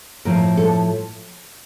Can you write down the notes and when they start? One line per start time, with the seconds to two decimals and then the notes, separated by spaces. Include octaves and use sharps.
0.25 A2 F3 A#4
0.57 A4